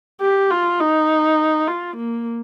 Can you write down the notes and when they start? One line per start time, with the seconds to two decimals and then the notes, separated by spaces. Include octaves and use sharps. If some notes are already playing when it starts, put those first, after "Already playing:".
0.21 G4
0.50 F4
0.80 D#4
1.67 F4
1.97 A#3